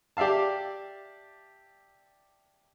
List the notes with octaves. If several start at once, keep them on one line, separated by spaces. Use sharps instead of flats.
G4 D5 E5 F5 A5